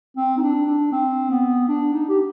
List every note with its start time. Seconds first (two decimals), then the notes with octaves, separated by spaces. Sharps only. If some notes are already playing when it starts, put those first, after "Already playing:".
0.17 C4
0.37 D#4
0.42 D4
0.67 D4
0.92 C4
1.31 B3
1.69 D4
1.94 D#4
2.09 G4